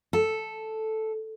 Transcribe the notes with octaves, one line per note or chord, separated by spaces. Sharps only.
A4